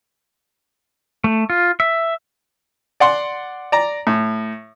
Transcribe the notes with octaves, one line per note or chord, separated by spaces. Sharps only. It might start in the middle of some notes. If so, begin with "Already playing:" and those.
A3
F4
E5
D5 F#5 C6
D5 A#5
A2